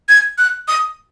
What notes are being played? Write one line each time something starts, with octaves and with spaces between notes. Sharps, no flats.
G#6
F#6
D#6